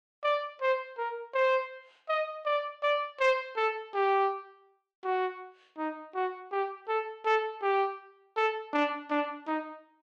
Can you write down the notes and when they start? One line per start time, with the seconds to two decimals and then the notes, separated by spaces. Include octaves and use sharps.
0.24 D5
0.62 C5
0.98 A#4
1.34 C5
2.09 D#5
2.45 D5
2.83 D5
3.20 C5
3.57 A4
3.94 G4
5.04 F#4
5.78 D#4
6.15 F#4
6.52 G4
6.88 A4
7.25 A4
7.62 G4
8.37 A4
8.73 D4
9.10 D4
9.47 D#4